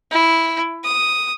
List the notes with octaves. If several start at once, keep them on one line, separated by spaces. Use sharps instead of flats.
E4
D#6